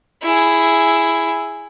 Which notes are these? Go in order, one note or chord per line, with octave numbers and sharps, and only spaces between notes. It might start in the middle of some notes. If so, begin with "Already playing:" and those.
E4 G#4